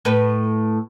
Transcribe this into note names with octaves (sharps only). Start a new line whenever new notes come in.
A2 B4